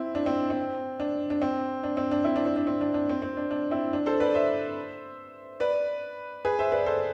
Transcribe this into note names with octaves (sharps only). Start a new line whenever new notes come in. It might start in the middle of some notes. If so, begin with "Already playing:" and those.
Already playing: C4 E4
D4
C4
C4
D4
D4
C4
D4
C4
D4
C4 E4
D4
C4
D4
C4
D4
D4
C4
C4
D4
D4
C4 E4
D4
A4 C5
B4 D5
C5 E5
B4 D5
G#4 B4
C5 E5
B4 D5
A4 C5